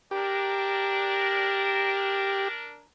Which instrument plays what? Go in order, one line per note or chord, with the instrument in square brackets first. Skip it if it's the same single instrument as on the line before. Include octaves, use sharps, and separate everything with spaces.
[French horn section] D4 A#4 [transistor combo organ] G4